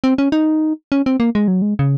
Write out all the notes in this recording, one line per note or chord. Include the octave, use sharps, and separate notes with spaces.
C4
C#4
D#4
C#4
C4
A#3
G#3
F#3
G#3
C#3